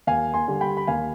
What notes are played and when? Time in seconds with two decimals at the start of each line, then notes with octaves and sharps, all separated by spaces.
0.07 D#2 F5 G#5
0.34 G#5 C6
0.48 D3 G3
0.61 G5 B5
0.77 B5
0.87 D#2 F5 G#5